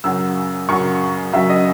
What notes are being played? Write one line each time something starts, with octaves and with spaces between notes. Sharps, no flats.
F#2 C#3 F#3 E6
F#2 C#3 F#3 C#6
F#2 C#3 F#3 E5
D#5